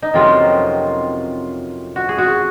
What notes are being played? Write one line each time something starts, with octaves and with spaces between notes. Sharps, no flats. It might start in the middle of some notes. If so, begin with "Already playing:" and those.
D#4
F2 C3 F#3 A#3 C#4 F4
F#4
G#4
F#4